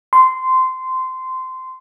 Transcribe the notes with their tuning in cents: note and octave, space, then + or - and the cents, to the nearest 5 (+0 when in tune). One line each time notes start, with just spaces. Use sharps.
C6 -15